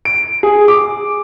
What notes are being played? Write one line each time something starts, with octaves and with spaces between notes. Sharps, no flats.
D7
G#4
D6